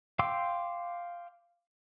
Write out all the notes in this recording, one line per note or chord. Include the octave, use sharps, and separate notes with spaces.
F5 G5 C6 D6 E6